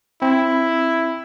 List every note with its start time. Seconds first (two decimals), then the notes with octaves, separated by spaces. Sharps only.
0.22 C4 E4